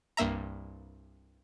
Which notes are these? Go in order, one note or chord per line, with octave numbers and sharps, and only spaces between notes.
C2 G2 A#3 E5 A#5